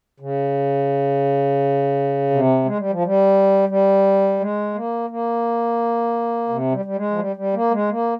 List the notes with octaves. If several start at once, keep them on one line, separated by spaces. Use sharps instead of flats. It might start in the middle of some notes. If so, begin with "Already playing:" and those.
C#3
C3
G#3
G3
F3
G3
G3
G#3
A#3
A#3
C3
G3
G3
G#3
F3
G3
G3
A#3
G#3
A#3